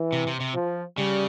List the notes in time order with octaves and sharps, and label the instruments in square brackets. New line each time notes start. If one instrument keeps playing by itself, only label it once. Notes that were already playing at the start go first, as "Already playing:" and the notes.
Already playing: [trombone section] E3
[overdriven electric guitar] C3
C3
C3
[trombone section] F3
[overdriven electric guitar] C#3 [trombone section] G3